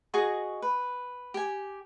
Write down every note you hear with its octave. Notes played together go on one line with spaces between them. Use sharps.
F#4 G#4 D#5 C#6
B4
G4 G#5